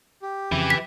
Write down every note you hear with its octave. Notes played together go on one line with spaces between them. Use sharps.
G4
F2 C#3 E3
B6